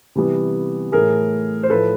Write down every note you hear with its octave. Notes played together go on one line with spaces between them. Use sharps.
C3 E3 G3 B3
A2 E3 A3 G#4 A#4
C5
A2 F3 A3 A4 B4